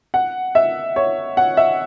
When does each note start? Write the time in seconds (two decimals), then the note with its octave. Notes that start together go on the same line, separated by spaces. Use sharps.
0.14 F#5
0.55 E5
0.96 C#5
1.37 F#5
1.57 E5